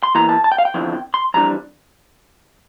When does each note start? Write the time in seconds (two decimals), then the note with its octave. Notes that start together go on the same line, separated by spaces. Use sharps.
0.03 C6
0.15 E2 E3 A#3 E4 A#5
0.29 A5
0.44 A5
0.52 G5
0.58 F5
0.65 G5
0.74 E2 D3 F3 C4 E4
1.14 C6
1.34 F2 E3 G3 D4 A#5